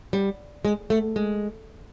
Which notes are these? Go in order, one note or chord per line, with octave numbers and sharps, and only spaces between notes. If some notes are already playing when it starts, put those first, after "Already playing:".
G3
G#3
A3
G#3